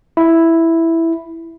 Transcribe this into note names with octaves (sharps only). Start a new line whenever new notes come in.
E4